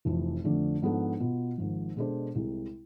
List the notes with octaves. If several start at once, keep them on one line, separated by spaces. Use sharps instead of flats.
F1 F2 E3
F2 D3 A3 D4
G#2 F3 B3 D4 A4
B2 B3 F4
G#1 G#2 F3
B2 G#3 D4 A4 C5
C2 C3 G#3